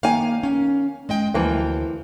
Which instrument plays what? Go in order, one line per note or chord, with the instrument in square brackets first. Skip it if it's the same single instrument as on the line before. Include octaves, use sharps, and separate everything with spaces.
[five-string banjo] D#3 G#5 [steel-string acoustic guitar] A#3 F5
[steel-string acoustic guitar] C#4
G#3 D#5 G5
[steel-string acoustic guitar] D2 G5 [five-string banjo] E3 F3 A#3